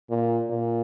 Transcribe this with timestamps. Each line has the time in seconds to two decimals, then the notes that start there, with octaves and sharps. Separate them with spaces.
0.10 A#2
0.50 A#2